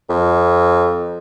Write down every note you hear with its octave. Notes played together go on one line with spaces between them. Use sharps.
F2